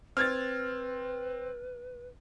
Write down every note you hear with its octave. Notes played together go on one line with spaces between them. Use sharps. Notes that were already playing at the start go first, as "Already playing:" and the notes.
C4 B4 F6 G#6 A6